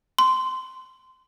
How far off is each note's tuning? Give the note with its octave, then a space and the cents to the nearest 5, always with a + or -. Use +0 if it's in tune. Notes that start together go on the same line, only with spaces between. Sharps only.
C6 -15